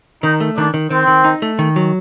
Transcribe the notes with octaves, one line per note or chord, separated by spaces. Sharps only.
D#3 D#4
A3
D#3 D4
D#3
D#3 C4
D#3
D#4
A3
D#3
F#3